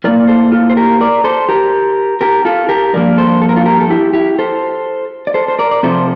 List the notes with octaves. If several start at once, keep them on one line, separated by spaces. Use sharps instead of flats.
A2 G3 A#3 A#4 D5
A4 C5
F4 A4
C5
G4 A#4
A#4 D5
A4 C5
G4 A#4
G4 A#4
F4 A4
G4 A#4
G2 F3 A#3 A#4 D5
A4 C5
A4
A#4
F4 A4
G4 A#4
A4
E4 G4
E4 G4
A4 C5
D5
A4 C5
C5
A#4 D5
D5
C3 F3 A3 C4 A4 C5